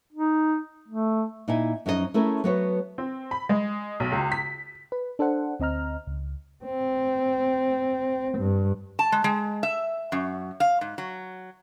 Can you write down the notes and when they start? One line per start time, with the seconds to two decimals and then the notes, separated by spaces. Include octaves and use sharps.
0.12 D#4
0.88 A3
1.48 A#2 D#4 E4 G#5
1.86 F#2 F3 C#4 D#4 G4 D#5
2.14 A3 C#4 E4 G#4 A#4
2.44 F#3 A3 B3 F#4 B4 C#5
2.98 C4
3.31 B5
3.49 G#3
4.00 B1
4.12 C#2
4.32 B6
4.92 B4
5.19 D4 A4 C5 F#5
5.60 D2 C4 D#5 A#5 F6
6.07 C#2
6.64 C4
8.38 G2
8.99 A5
9.12 G#3
9.24 G#3
9.63 E5
10.12 F#2
10.60 F5
10.81 G#2
10.98 F#3